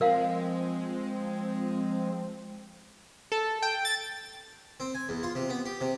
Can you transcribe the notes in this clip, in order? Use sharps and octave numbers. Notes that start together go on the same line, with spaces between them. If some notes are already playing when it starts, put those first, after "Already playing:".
F3 G#3 C4 A#4 F5
A4
G5
A6
C4
G#5
E2
F4
C3
B3
G4
C3